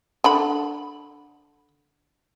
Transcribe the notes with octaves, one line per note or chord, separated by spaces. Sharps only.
D3 B5